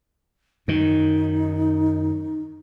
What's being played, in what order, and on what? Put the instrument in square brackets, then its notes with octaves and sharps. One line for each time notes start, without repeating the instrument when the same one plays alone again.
[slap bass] F#2 D#3 [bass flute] D#4